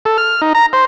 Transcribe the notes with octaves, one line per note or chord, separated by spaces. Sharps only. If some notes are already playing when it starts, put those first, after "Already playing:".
A4
F6
D#4
A#5
C5